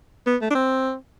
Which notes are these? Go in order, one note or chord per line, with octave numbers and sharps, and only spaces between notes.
B3
A3
D4
C4